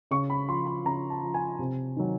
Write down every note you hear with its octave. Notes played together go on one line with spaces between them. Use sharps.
C#3 C#6
B5
F3 C6
B5
C#3 A#5
A5
F3
G#5
C3
D#3 F#3